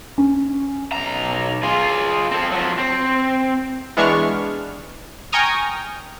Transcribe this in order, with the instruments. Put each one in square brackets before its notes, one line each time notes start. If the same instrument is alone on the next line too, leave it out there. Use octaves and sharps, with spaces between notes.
[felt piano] C#4
[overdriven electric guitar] B1 A#5
F4 G#4
C4 A4
F3 F#3
C4
[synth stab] E3 G#3 B3 D4 C#6 F6
G5 G#5 A#5 C#6 D#6 F6